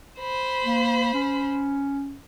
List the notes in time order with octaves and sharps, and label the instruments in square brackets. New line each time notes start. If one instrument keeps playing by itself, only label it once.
[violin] C5 B5
[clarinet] A#3
C#4